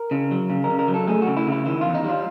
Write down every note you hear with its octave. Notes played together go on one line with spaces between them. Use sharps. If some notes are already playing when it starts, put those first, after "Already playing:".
Already playing: A#4
C#3
F#3
C#3
A#4
C#3
A#4
F#3
A4
A3 G#4
F#4
C#3
E4
C#3 E4
D#3 E4
E2 F4
D#4
G3 F4